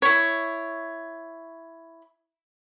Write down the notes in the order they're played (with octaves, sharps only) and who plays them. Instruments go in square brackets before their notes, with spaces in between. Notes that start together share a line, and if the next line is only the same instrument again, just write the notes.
[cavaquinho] E4 C#5